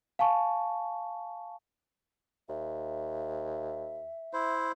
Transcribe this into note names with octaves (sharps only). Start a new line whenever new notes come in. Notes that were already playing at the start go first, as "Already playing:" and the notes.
F5 G#5 A5 C#6
D#2 E5
E4 C5